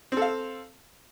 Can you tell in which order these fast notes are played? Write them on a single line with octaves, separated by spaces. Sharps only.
C4 A4 F5